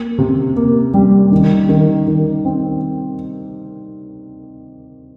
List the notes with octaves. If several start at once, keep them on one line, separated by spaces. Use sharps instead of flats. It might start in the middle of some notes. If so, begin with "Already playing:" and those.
Already playing: A#3
C3
A#3
G3
D#3
D#3
D#3
C4